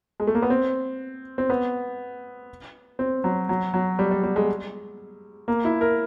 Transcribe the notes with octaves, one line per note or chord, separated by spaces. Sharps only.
G#3
A3
A#3
B3
C4
C4
B3
C4
F#3
F#3
F#3
G3
G3
G3
G#3
A#3
E4
A#4